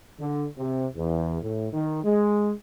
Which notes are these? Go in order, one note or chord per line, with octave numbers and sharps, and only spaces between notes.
D3
C3
E2
A2
D#3
G#3